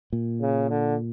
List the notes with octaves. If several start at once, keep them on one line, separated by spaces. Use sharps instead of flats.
A#2
C#3
D3